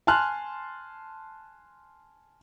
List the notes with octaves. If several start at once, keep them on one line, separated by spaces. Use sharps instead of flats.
G#5 A5 C6 F6 F#6